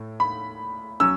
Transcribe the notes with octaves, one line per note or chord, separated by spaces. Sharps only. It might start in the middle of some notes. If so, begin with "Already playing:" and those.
Already playing: A2 A3
B5
F#3 C#4 E6